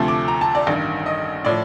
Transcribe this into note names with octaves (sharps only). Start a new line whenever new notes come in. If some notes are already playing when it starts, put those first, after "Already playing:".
Already playing: D2 C3 F3 A3
D6
A#5
A5
D5
A1 G2 D#3
D#5
A2 F3 D5